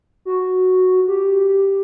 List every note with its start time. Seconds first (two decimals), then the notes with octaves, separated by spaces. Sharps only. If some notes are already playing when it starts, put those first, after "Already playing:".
0.25 F#4
1.08 G4